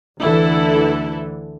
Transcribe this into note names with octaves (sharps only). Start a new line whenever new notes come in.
D2 D3 E3 E4 A4